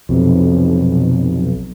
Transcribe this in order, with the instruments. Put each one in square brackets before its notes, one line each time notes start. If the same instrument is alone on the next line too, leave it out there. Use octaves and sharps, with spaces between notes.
[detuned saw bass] B1 [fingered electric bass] F2 C3